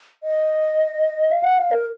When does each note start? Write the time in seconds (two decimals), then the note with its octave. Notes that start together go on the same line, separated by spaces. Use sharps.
0.23 D#5
1.31 F5
1.44 F#5
1.58 F5
1.71 A#4